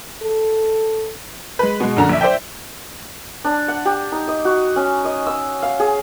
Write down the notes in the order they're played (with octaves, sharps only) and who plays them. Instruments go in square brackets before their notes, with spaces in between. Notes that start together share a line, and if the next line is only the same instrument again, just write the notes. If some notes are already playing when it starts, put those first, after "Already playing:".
[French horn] A4
[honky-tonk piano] G#3 B4
B2 G#3
F#2 D3 A#5
A#1 E5
C5 D5 E5 G5
[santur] D4
F#5
G4
D#4
D#5
F#4
C#4
D#5
E6
F5
G#4